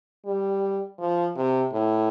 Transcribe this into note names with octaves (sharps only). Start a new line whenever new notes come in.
G3
F3
C3
A2